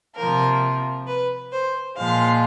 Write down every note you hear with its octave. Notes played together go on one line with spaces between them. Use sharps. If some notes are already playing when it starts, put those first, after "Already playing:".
C3 F3 A#3 A#4
B4
C5
A#2 F3 G#3 F5